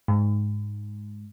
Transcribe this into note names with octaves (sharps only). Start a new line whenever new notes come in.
G#2